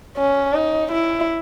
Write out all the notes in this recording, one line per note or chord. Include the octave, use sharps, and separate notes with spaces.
C#4
D#4
E4